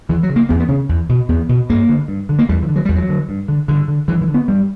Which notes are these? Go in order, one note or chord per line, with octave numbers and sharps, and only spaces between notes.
E2 E3
F#3
C#3
A#3
E2 B3
B3
C#3 C#4
E2
B2
E2 B3
B2
G2 A#3
D3
G2
D3
A#3
E2 G3
E3
D3
F#3
E2 G3
F#3
D3
G2
D3
G2 D3
D3
G2 E3
E3
D3
B3
G2 G3